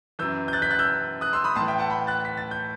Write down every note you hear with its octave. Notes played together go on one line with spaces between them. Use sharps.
F#2 E3 E6 G6
G6
F#6 A6
G6 B6
F#6 A6
E6 G6
D#6 F#6
C6 E6
B5 D#6
A2 A5 C6
E3
E5 G5
F#5 A5
G5 B5
F#6 A6
B6
A6
G6